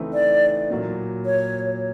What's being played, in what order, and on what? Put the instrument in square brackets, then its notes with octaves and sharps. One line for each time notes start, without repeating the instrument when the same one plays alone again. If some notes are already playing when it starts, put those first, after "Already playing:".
Already playing: [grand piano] C#3 E3 A3 C4 D#4
[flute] D5
[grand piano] A#2 F#3 A#3
[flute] C#5